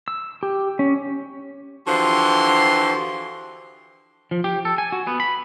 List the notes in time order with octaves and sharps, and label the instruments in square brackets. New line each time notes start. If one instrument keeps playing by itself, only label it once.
[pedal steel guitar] E6
G4
C#4
[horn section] D3 E3 F3 F#4 G4 C6
[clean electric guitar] F3
G4
A4
G#5
F#4
B3
B5